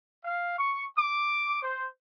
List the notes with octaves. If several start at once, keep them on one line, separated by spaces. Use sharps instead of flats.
F5
C#6
D6
C5